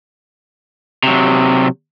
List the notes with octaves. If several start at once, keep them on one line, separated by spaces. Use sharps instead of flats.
C3 F#3